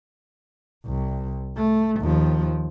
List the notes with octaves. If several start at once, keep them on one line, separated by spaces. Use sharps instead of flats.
C2
A3
D#2 F3